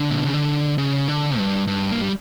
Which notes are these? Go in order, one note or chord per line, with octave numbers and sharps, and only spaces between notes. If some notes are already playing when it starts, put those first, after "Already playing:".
Already playing: D3
A#2
B2
C#3
D3
C#3
D3
G2
G2
A#3
G3